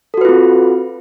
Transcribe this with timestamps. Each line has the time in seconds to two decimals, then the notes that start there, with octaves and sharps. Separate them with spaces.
0.14 A4
0.17 F#4
0.21 B4
0.25 F4
0.29 C4